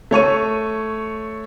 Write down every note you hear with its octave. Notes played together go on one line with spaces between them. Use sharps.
A3 C#5 C#6 D#7